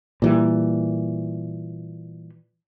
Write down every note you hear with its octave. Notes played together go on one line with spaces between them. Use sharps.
A#2 E3 G3